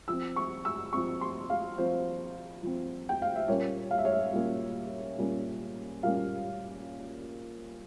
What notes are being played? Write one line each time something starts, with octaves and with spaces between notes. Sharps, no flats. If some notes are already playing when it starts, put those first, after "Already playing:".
F3 C4 E6
C#6
E6
F3 C4 C#6
C6
F5
F3 C4 C5
F3 C4
G5
F5
E5
A#2 G3 A#3 C#4 C#5
F5
E5
C#5
E5
A#2 G3 A#3 C#4
A#2 G3 A#3 C#4
A#2 G3 A#3 C#4 F5